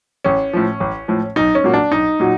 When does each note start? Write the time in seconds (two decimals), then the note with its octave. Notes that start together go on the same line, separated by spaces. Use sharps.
0.24 A1 C#4
0.53 A2 F3
0.80 A1
1.08 A2 F3
1.36 B1 D#4
1.55 C#4
1.64 A#2 F#3 A#3
1.74 D4
1.92 B1 D#4
2.20 A#2 F#3